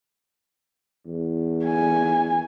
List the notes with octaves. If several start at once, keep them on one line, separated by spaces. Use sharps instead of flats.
E2
G#5